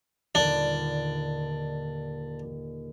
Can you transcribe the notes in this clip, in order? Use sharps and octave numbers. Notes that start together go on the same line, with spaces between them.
D#1 D#2 D3 D4